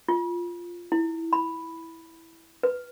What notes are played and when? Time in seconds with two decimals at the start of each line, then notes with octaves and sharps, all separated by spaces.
0.09 F4
0.92 E4
1.33 B5
2.63 B4